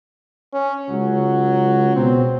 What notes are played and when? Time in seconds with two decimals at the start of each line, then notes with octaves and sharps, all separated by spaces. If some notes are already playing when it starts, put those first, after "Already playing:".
0.53 C#4
0.89 C#2 F#3
1.96 B2 C4